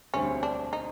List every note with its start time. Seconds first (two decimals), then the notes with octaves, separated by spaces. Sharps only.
0.14 E1 D2 D3 G3 C4 C#4
0.43 D4
0.73 D#4